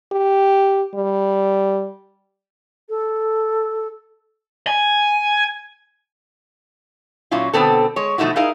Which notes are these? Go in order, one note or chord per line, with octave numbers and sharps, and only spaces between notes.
G4
G3
A4
G#5
A#2 F#3 C#4 E4 F4
B2 D3 B3 C4 A4
G#3 C#5
B2 F3 A3 D#4 E4 F#4
D#4 E4 G#4 A#4 F5